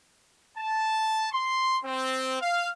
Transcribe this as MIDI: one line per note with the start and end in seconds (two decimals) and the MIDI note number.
0.58 1.26 81
1.32 1.79 84
1.84 2.37 60
2.41 2.68 77